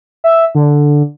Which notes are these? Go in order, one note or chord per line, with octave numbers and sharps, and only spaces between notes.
E5
D3